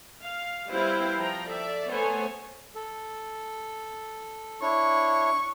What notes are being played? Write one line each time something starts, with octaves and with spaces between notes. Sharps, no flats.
F5
G3 C4 E4 B4 C5 F5
F3 G5 A#5
A4 D5 E5
A3 B3 C5 C#5 G#5
A4
D4 E4 C#5 C#6